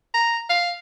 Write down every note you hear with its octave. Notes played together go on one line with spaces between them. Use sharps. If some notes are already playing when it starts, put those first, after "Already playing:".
A#5
F5